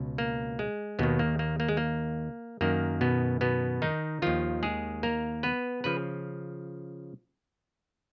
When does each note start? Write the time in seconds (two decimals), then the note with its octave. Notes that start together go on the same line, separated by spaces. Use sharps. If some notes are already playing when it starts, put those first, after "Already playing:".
Already playing: C#2 B2
0.18 A#3
0.59 G#3
0.99 D#2 B2 D#3 B3
1.19 A#3
1.39 A#3
1.60 A#3
1.69 G#3
1.77 A#3
2.61 F#2 D#3 A#3
3.01 B2 B3
3.41 B2 B3
3.82 D#3 D#4
4.22 D#2 D#3 F3 F4
4.63 G#3 G#4
5.03 A#3 A#4
5.43 B3 B4
5.84 C#3 F3 B4